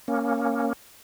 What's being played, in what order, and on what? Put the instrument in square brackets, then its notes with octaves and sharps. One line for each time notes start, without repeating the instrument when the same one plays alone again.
[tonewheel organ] A#3 C#4